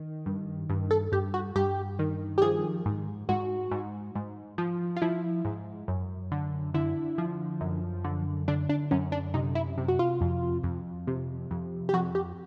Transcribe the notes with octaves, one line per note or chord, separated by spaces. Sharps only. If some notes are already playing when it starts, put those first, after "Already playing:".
Already playing: D#3
G2
G2
A4
G2 G4
F#4
G2 G4
D#3
G4
F3 G#4
G#2
G#2 F#4
G#2
G#2
F3
F4
F3 E4
G#2
F#2
D3
D3 E4
F3
F#2
D3
D3 D4
D4
F#2 C#4
D4
C3 D#4
E4
C3
F#4
F4
F2
F2
C3
F2
G4
F2 F#4
G4